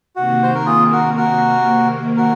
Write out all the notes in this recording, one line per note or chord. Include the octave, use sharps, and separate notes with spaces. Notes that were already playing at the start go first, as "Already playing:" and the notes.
C3 D#3 A#3 F#4
C5
A#4
F4 G#4
F#4 A#4
F#4 A#4
F#4 A#4